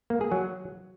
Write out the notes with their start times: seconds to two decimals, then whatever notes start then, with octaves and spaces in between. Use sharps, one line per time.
0.10 A#3
0.21 G#4
0.32 F#3